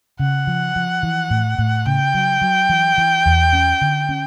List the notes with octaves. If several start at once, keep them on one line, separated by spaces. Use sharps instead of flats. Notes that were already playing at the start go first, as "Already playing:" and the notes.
C#3 F#5
F3
F3
E3
A2
A2
C#3 G5
F#3
F#3
E3
E3
E2
C#4
D3
C#4